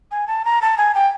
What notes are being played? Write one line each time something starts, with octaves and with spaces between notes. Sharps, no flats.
G#5
A5
A#5
A5
G#5
G5